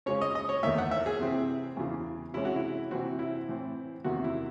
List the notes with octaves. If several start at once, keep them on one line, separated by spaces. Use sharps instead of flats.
C#3 G#3 C#4 C#5
D#5
D#5
C#5
E2 D#3 A3 E5
F#5
E5
G#4
C3 E3 C4
E2 C#3 E3
C3 E3 G#3 C#4 E4
F#4
E4
C3 E3 C4 F#4
E4
A2 E3 C4
E2 C3 D#3 F#4
E4